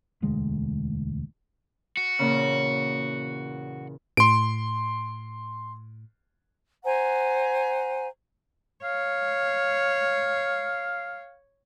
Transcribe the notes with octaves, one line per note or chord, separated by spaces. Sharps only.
E1 D2 G#3
F#4
E2 A#2 C#3
A2 C6 D7
C5 F#5 G#5 A#5
C#5 F5